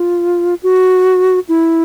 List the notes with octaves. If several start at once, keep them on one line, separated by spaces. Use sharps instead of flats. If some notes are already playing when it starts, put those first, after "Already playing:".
Already playing: F4
F#4
E4